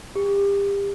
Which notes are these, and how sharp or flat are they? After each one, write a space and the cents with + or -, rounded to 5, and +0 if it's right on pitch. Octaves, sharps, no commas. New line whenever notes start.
G4 +30